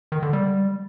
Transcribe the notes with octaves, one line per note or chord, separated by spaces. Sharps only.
D#3
D3
G3